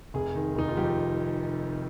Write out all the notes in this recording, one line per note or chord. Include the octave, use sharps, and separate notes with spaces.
F1 G#4
D#3
F1 D#4
F4
F2 G4